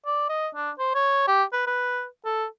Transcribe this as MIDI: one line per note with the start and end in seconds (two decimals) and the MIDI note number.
0.06 0.27 74
0.29 0.48 75
0.55 0.71 62
0.79 0.92 72
0.95 1.27 73
1.28 1.43 67
1.53 1.63 71
1.67 2.05 71
2.25 2.45 69